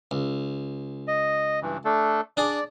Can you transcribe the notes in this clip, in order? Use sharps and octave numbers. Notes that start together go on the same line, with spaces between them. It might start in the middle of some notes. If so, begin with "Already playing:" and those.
C#2
D#5
G2 E3
A3 D4 A4
D4 G#4 D5